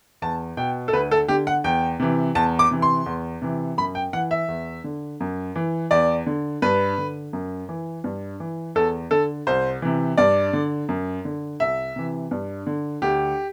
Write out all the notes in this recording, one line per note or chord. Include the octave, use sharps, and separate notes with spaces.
E2 A5
B2 G5
A4
D2 B4
A4
D3 G4
F#5
E2 G5
C3 E3
E2 A5
D6
C3 E3
C6
E2
C3 E3
F#2 B5
G5
E3 F#5
E5
E2
D3
F#2
E3
E2 D5
D3
G2 B4
D3
F#2
E3
G2
E3
E2 A4
D3 A4
C2 C5
C3 E3
G2 D5
D3
F#2
D3
C2 E5
C3 E3
G2
D3
D2 G4